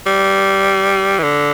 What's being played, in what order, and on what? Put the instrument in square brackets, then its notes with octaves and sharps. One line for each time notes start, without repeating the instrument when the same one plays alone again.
[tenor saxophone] G3
E3
D3